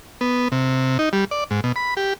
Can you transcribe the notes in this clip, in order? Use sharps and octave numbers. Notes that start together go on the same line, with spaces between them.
B3
C3
D#4
G3
D5
G#2
B2
B5
G4